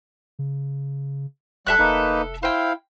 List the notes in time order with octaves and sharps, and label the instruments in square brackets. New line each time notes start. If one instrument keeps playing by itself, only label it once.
[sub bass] C#3
[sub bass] D1 [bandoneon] G3 [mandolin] A4 E5 F#6
[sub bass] F1 [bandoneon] A#3 D#4 B4
[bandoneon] E4 F5 [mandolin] C5 G5